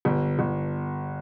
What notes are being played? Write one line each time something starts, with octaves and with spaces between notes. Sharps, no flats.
G1
G1